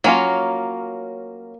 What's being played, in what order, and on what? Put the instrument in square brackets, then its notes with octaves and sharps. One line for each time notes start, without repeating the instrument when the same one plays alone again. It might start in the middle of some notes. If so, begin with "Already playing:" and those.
[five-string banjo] F#3 C#4 F4 [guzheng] A#3